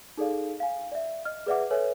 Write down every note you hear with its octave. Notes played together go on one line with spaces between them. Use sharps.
D#4 G#4 A4 D5 F5
F5 G#5
D5 E5
D#5 F6
G#4 B4 D5 E5 F#5 D6
A4 B4 C#5 E5 G#5